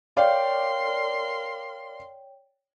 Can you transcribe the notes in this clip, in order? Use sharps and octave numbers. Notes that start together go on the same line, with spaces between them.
A#4 C#5 D5 F5 G5 C6